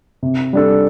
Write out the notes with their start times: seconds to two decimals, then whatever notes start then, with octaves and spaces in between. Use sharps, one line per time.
0.23 C3
0.53 G3 D4 A4